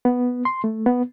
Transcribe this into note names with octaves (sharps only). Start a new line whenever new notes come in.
B3
C6
A3
B3